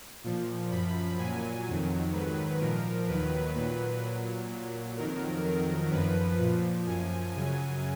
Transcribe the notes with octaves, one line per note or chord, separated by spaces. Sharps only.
A#2 F3
F#2 F3 B5
A#2 F#3 G#5
F2 D#3 F#3
G#2 D#3 F#3 B4
A#2 F3 A#4
D#2 D#3 F#3 B4
A#2 F#3 B4
A#2 F#3
A#2 F#3
F2 D#3 F#3 A#4
F2 D#3 F#3 A#4
F#2 F3 B4
A#2 F3
F#2 F3 G#5
F#2 C#3 F#3 G#5